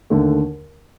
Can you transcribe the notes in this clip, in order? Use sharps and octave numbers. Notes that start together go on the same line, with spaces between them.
D#2 D3 A3